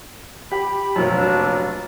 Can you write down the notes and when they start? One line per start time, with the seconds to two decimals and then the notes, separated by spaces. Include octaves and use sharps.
0.52 G4 B5
0.96 F1 A#1 F#2
1.14 D4